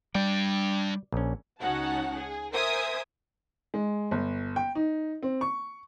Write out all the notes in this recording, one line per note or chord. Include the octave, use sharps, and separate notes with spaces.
G3 D4 D5 G5
A#1 C#4
C#2 C#4 D#4 F#4 F#5 A5
G#4
A#4 C5 E5 G#5 D#6 G#6
G#3
G1
G5
D#4
C4
C#6